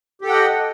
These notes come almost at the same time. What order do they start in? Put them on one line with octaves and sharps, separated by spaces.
G4 A4 G5 F#5 D#5